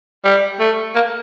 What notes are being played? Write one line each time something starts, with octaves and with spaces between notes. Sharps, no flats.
G3
A3
A#3